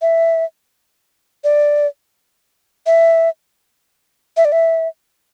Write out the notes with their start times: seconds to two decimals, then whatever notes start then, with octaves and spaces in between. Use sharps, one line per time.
0.02 E5
1.44 D5
2.86 E5
4.37 E5
4.45 D5
4.52 E5